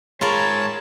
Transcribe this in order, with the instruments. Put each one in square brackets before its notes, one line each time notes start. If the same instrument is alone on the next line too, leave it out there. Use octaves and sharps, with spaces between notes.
[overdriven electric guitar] G#2 B5 [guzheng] F4 A#4 [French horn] G#4 [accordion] C#5 A5